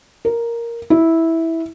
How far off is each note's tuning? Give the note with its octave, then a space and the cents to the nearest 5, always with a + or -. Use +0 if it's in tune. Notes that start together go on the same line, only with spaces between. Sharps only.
A#4 +0
E4 -10